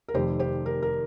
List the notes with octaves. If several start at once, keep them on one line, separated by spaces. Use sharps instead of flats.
A#4
F1 F2 C3 D#3 G4 C5
G4 C5
A#4
A#4